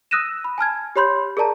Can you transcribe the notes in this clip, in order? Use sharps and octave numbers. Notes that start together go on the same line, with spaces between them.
D#6 E6 F#6 A#6 D#7 E7
B5
G#5 A5 F6 G#6
G4 C#5 B5 C6 G6
G#4 A#4 D5 A5 A#5